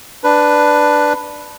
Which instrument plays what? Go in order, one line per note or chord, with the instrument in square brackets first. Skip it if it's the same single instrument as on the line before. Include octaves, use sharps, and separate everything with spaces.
[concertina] D4 B4